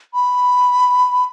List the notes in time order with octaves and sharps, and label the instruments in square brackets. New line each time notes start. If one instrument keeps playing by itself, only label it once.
[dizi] B5